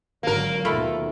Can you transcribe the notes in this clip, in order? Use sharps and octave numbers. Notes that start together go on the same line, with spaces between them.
G#1 D3 F#3 A#3 A#4
D#2 B2 D#3 A3 F4 A4 B5